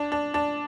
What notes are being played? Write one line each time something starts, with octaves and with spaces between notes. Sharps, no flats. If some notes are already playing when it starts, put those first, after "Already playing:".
Already playing: D4
D4
D4